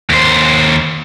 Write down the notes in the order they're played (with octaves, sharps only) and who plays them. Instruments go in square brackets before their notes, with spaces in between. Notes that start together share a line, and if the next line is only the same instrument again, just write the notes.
[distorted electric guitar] D#2 C5